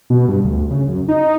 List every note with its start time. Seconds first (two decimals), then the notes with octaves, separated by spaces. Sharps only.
0.10 B2
0.28 G2
0.45 D2
0.71 C#3
0.88 F#2
1.08 D#4